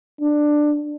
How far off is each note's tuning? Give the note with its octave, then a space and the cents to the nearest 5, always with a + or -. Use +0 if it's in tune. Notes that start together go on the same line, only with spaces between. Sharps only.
D4 +15